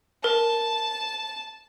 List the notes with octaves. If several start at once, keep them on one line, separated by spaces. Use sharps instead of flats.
A#4 A5